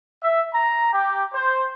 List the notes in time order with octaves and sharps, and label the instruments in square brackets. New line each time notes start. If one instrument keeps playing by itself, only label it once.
[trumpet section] E5
A#5
G4
C5